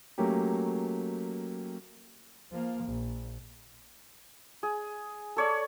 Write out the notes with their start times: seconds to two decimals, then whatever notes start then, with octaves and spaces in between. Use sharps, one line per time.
0.18 F#3 A3 A#3 C#4 G4
2.52 F3 A#3
2.85 A#1
4.63 G#4
5.37 A4 C#5 D5